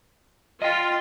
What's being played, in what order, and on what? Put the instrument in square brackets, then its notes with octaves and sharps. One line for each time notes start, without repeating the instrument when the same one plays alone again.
[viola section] F4 [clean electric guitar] D#5 G5